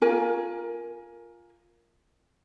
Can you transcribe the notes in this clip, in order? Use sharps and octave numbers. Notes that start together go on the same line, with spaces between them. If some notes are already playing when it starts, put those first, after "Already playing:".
F4 A#4 G#5